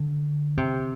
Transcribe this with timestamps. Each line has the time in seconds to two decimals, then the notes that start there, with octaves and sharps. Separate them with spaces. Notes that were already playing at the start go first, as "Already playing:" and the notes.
Already playing: D3
0.57 C3